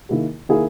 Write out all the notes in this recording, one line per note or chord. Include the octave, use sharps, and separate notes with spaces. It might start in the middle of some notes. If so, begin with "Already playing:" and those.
D#3 A#3 E4 G#4
D#3 A#3 E4 G#4